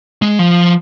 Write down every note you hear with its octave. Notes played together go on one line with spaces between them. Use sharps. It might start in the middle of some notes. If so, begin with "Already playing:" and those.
G#3
F3